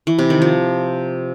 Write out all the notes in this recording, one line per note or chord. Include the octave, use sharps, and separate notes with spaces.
E3
C3
D#3
F3